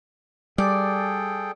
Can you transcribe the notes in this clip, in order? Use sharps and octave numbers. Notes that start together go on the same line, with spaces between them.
G3 G#4 A4 D5 G5